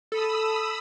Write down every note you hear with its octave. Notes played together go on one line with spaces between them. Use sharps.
A4 B5 D#6 E6